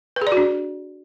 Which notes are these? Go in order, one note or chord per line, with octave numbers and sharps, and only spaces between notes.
B4
G#4
D5
F#4
D4